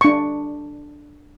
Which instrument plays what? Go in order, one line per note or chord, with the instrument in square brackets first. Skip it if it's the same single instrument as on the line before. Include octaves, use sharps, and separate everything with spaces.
[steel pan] D4 C#6